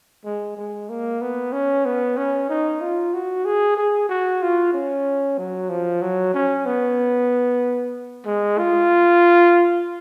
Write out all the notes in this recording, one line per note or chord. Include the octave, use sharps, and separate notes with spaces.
G#3
G#3
A#3
B3
C#4
B3
C#4
D#4
F4
F#4
G#4
G#4
F#4
F4
C#4
F#3
F3
F#3
C#4
B3
G#3
F4